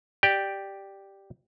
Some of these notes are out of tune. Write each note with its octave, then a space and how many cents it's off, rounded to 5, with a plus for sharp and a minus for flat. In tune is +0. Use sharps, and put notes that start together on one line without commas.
G4 +0 D5 +10 G5 +0